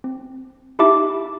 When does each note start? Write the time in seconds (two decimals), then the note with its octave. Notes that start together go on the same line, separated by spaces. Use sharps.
0.04 C4
0.79 D#4 E4 G4 E5 A5 D6